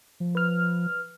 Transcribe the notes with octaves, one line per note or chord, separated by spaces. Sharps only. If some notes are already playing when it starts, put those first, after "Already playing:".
F3
B4 F6